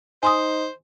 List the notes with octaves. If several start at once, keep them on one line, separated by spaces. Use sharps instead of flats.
D#4 C5 G#5 C6 D#6